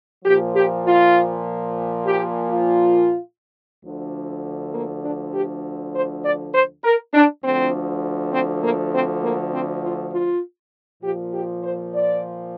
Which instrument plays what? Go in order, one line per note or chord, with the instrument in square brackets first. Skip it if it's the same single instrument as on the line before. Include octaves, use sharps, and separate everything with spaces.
[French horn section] A#2 F3 G4
G4
F4
G4
F4
D2 D3 F3
A#3
D4
G4
C5
D5
C5
A#4
D4
D2 D3 F3 C4
C4
A#3
C4
A#3
C4
F4
F4
A#2 F3 G4
G4
C5
D5